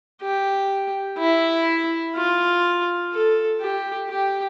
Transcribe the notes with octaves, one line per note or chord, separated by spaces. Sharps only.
G4
E4
F4
A4
G4
G4